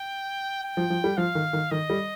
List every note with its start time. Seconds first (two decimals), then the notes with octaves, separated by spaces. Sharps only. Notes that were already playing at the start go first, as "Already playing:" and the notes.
Already playing: G5
0.63 G5
0.77 F3
0.90 F3
1.04 G3
1.17 F3 F5
1.35 D#3
1.53 D#3
1.71 D#3 D#5
1.90 G3